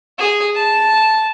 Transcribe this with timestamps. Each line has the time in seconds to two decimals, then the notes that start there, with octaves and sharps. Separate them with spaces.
0.19 G#4
0.55 A5